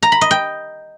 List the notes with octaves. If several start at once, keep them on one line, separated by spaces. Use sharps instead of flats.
A#5
B5
D#5
G5